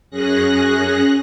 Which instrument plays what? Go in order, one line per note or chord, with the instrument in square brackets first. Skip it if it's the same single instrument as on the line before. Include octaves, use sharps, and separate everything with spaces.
[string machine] F#2 C#4 G#4 F#6 A#6